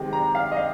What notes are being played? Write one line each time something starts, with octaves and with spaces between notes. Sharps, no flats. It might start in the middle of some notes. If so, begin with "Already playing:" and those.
Already playing: C3 D#3 G#3
A#5
F5
D#5
F5